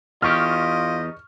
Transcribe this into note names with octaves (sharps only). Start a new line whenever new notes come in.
E2 D#4 F4 G4 D#5 C#6 F6